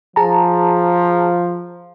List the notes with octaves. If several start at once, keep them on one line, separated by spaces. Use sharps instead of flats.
F3 G#4 A5 A#5